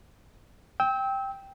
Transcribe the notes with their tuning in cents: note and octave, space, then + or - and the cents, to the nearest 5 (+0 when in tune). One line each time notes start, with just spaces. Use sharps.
G5 +0 E6 -30